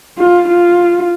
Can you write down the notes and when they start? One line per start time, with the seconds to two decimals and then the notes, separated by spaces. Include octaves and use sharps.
0.18 F4
0.49 F4